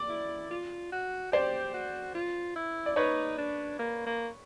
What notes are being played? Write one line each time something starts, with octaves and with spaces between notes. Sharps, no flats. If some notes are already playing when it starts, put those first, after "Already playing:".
Already playing: D5
E4
F4
F#4
G4 C5 D5
F#4
F4
E4
D5
D#4 B4 C#5
D4
A#3
A#3